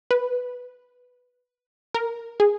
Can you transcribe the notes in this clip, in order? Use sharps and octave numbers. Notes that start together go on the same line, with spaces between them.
B4
A#4
G#4